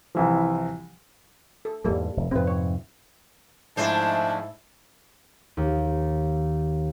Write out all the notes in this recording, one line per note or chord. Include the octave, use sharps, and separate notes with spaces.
C2 E3 F3
A4
E2 G#2 G3 A#3 A4
F1
F2 G#2 C3 C4 B4
C#5
G#2 F3 G#3 A3 D4 E4 C5 A5
D#2